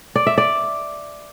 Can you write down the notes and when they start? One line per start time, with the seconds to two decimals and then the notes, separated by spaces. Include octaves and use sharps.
0.16 D5
0.27 E5
0.38 D5